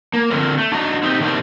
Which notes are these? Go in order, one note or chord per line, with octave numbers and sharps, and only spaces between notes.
A#3
D3 C4 F4 A4 A#4
A3
D4 F#4 D5 D#5 A#5
C4 D#4 G4
C3 D#3 G3 C4 D4